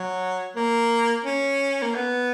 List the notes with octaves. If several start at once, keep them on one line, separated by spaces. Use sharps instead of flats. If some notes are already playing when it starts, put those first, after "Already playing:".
Already playing: F#3
A#3
C#4
A#3
B3